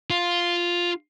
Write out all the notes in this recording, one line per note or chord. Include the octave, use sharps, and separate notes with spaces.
F4